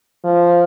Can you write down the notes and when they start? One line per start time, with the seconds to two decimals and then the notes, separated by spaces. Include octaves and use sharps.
0.24 F3